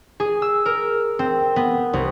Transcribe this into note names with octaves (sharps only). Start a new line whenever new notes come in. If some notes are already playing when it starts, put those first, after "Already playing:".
G#4
E6
A#4
C4
B3
C2